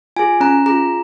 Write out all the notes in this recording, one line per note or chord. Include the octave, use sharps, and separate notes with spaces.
F4 G#4 G#5
C#4 A#5
F4 G#4 A#5